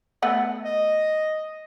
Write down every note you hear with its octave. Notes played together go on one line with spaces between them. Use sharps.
A3 B3 F#5
D#5